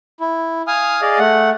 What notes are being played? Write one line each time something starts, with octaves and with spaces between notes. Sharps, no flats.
E4
F5 G#5 D#6 F6
G#4 D5 D#5 F5
A3 F#5